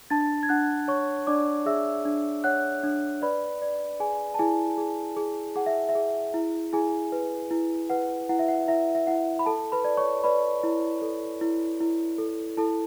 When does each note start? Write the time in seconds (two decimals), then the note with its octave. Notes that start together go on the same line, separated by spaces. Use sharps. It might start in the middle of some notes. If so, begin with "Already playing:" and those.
0.10 D4 A5 A6
0.43 G#6
0.49 D4 F#5 F#6
0.88 C#5 C#6
1.27 D4 D5 D6
1.66 G#4 E5 E6
2.05 D4
2.44 C#5 F#5 F#6
2.83 D4
3.22 B4 D5 B5
3.62 D5
4.00 G#4 G#5
4.34 A5
4.39 E4 G#4 G#5
4.78 G#4
5.17 G#4
5.56 G#4 F#5
5.66 E5
5.89 E5
5.95 G#4
6.34 E4
6.73 E4 G#4 G#5
7.12 B4
7.51 E4
7.90 B4 F#5
8.29 E4 F#5
8.39 E5
8.48 F#5
8.68 E4 E5
8.95 E5
9.07 E4 F#5
9.39 B5
9.46 A4 A5
9.72 B4 B5
9.85 D5
9.97 C#5 C#6
10.24 B4 D5 B5
10.64 E4
11.02 A4
11.41 E4
11.80 E4
12.18 A4
12.57 E4 A4 A5